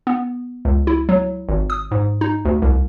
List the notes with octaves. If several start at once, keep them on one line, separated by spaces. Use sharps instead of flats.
B3
C#2
E4
F#3
G#1
D#6
G#2
D#4
D2
C2